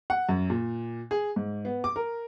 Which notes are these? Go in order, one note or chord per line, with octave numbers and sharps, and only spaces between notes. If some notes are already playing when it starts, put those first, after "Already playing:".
F#5
F#2
A#2
G#4
G#2
B3
D6
A#4